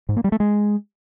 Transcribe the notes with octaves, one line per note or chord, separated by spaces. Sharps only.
G#2
A#3
G3
A3
G#3